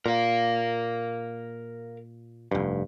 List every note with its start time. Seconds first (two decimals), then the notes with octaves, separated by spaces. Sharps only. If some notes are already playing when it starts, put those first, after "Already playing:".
0.06 A#2 A#4 F5
2.51 F1 G2